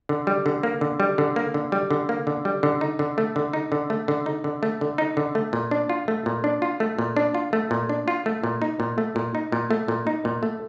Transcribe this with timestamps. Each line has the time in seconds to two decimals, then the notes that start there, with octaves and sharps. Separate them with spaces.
0.09 D3
0.27 G3
0.46 D3
0.63 A#3
0.81 D3
1.00 G3
1.18 D3
1.36 A#3
1.54 D3
1.72 G3
1.91 D3
2.09 A#3
2.27 D3
2.45 G3
2.63 D3
2.81 D#4
2.99 D3
3.18 A3
3.36 D3
3.53 D#4
3.72 D3
3.90 A3
4.08 D3
4.26 D#4
4.44 D3
4.63 A3
4.81 D3
4.98 D#4
5.17 D3
5.35 A3
5.53 A#2
5.71 D4
5.90 F4
6.08 A3
6.26 A#2
6.44 D4
6.62 F4
6.80 A3
6.99 A#2
7.17 D4
7.34 F4
7.53 A3
7.71 A#2
7.89 D4
8.08 F4
8.26 A3
8.43 A#2
8.62 D#4
8.80 A#2
8.98 A3
9.16 A#2
9.35 D#4
9.52 A#2
9.71 A3
9.88 A#2
10.07 D#4
10.25 A#2
10.43 A3